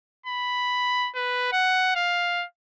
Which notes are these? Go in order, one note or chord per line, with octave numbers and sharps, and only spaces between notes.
B5
B4
F#5
F5